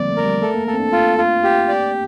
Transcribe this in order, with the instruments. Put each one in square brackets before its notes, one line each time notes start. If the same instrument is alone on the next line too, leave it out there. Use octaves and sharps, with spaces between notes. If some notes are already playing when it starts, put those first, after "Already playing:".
Already playing: [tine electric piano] D3 F3 G3 A#3 C4 [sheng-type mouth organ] D5
[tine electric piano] A3
[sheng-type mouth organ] A#4
[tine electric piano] G3
[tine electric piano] A3 [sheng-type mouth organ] A4
[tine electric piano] A#3
[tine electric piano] A#3 [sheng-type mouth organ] A4
[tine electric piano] C4
D4
[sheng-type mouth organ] F4
F4
G4
D5